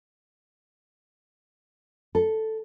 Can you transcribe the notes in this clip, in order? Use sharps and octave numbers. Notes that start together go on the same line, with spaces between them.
A4